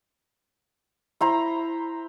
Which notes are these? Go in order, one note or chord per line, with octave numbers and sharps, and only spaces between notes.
E4 C5 A#5